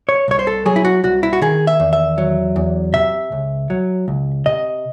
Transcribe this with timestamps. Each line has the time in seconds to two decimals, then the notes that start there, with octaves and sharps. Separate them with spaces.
0.09 C#5
0.28 C2 C#5
0.39 C5
0.47 A4
0.66 F#3 G#4
0.76 E4
0.85 F#4
1.04 C2 F#4
1.23 E4
1.33 F#4
1.42 D#3 G#4
1.67 E5
1.80 E2
1.93 E5
2.18 F#3
2.56 E2
2.94 C3 E5
3.32 C#2
3.70 F#3
4.08 C#2
4.46 C3 D#5